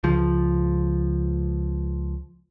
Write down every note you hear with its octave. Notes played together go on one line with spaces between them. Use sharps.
C#2 F3